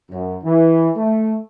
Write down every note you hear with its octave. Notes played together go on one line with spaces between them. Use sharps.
F#2
E3
A3